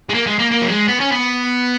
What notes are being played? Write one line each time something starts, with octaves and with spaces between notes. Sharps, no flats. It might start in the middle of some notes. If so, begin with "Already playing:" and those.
G#3
A#3
G#3
A#3
A#3
F#3
G#3
B3
C#4
B3